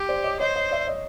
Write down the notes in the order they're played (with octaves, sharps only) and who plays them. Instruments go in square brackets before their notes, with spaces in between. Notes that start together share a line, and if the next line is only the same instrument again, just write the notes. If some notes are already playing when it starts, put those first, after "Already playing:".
Already playing: [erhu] G4
[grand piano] C5 D5
C#5 D#5
[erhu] C5 [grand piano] C#5 D#5
[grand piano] C#5 D#5
D5 E5
C#5 D#5